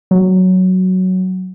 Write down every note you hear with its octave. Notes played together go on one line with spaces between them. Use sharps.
F#3